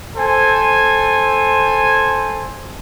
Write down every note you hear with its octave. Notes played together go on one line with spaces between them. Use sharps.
A4 C5 G#5